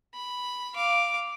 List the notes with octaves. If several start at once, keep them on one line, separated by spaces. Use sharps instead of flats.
B5
F5 D6